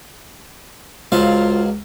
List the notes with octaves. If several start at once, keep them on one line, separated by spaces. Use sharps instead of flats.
C#2 F#3 F4 C5 F5